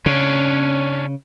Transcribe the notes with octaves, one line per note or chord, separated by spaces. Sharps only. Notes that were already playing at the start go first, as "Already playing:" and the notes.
C#3 C#4 D4